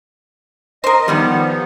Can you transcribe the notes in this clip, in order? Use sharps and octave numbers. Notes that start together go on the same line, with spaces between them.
A#4 C5 D#5
G2 D#3 F3 G3 B3